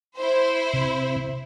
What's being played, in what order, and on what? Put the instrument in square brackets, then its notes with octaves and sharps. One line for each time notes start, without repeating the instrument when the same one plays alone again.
[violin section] E4 C5
[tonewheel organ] C3